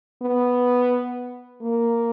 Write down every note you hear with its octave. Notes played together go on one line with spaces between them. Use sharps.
B3
A#3